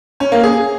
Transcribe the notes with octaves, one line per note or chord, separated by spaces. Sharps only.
C#4
A#3
G#4